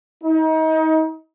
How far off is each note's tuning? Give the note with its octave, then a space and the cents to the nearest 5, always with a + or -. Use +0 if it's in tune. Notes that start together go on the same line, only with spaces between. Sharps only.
D#4 +35